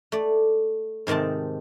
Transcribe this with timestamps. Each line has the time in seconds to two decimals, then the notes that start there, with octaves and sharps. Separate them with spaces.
0.12 A3 D5
1.07 G#2 C3 D#3 C4 A5